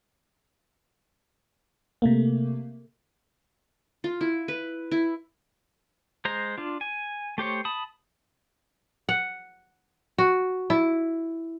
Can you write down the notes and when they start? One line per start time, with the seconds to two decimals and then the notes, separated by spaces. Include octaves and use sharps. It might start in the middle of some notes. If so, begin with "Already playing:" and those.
2.02 C3 A3 A#3
4.04 F4
4.21 E4
4.48 B4
4.91 E4
6.25 G#3 C5 A#5
6.58 D4 F4
6.81 G#5
7.38 A3 G4 C5 C#5
7.65 A5 B5 D#6
9.09 F#5
10.18 F#4
10.70 E4